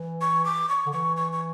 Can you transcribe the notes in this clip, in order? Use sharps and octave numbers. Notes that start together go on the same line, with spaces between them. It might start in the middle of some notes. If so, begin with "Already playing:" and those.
Already playing: E3
C#6
D6
C#6
D3
E3 C#6
C#6
C#6